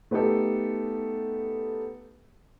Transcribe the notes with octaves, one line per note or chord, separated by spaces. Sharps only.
A3 B3 D#4 G4 A4